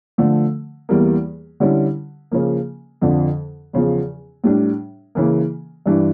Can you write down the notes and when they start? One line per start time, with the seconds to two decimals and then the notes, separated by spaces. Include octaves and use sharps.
0.18 D3 F3 A3
0.89 E2 E3 G3 A#3
1.60 D3 G3 C#4 E4
2.32 C#3 F3 A#3
3.01 F2 D3 F3
3.73 E2 C#3 F3
4.44 A2 G3 D4
5.15 C#3 E3 A#3
5.86 G2 E3 G3 D4